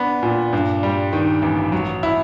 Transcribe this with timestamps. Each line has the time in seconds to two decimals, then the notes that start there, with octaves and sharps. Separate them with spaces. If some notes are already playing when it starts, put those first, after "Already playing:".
Already playing: B3 D4
0.23 A#2
0.53 G2
0.83 G3
1.13 D#3
1.42 A1
1.72 F#3
2.03 E4